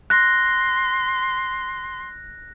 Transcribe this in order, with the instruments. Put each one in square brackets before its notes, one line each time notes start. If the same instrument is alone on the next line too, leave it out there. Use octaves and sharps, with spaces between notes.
[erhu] C6 [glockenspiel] F#6 A#6